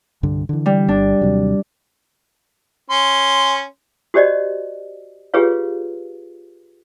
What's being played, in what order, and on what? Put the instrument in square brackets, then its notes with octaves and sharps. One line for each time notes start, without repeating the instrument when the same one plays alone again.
[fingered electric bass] C2 G2 D3
D3 E3
[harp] G3
[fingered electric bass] G1 [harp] D4
[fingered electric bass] D#2 C3 F#3
[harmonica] C#4 C6
[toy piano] F#4 G4 C5 D5 D#5
F4 G4 G#4 B4 C#5 F5